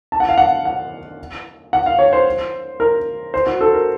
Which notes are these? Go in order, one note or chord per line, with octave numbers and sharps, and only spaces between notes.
A5
F#5
F5
F#5
F#5
F#5
F5
C#5
C5
A#4
C5
F#4
A4
A#4